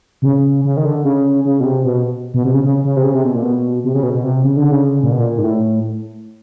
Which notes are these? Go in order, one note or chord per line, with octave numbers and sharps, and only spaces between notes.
C3
C#3
C#3
D#3
D3
C#3
C#3
B2
C3
B2
B2
C3
C#3
C#3
C#3
C3
C#3
C3
B2
A#2
B2
C3
C#3
B2
B2
C3
C#3
D3
C#3
A#2
B2
A#2
G#2
A2